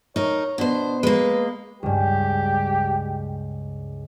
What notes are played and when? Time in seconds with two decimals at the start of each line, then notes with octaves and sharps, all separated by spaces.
0.16 D#4 A#4 C#5
0.58 B2 D4 C5
1.03 G#3 A#3 B4
1.83 C#2 G2 G4